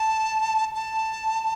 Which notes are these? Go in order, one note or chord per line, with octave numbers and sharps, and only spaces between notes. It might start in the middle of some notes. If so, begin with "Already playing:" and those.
Already playing: A5
A5